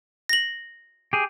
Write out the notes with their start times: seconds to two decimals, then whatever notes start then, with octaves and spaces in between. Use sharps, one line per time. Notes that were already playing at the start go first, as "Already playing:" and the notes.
0.29 A#6 F#7
1.13 G4 G#4